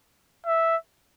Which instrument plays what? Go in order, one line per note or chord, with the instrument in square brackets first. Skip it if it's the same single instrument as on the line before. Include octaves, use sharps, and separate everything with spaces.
[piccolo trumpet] E5